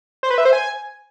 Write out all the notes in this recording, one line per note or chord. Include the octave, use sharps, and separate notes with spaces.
C5
B4
E5
C5
G#5